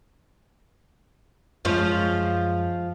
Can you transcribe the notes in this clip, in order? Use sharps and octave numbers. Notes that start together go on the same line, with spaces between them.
F#2 F3 G#3 C#4 F4